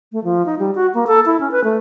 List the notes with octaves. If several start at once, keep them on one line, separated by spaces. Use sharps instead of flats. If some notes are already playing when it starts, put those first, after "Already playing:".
A3
F3
D#4
G3
F#4
A#3
A4
E4
C#4
B4
A3